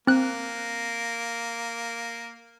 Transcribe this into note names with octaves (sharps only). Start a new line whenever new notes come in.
A#3 C4 F#6